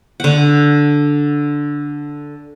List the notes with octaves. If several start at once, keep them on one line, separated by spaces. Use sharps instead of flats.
D3 F#5